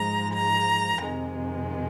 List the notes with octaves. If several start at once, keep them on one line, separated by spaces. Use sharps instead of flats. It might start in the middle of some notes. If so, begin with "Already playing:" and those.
Already playing: G#2 F3 G#3 A#5
A#5
F2 C3 D#3 G#3